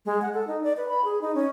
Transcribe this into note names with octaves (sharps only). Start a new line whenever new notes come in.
G#3
F#5
A4
D#4
D5
B4
B5
G#4
D#4
C#4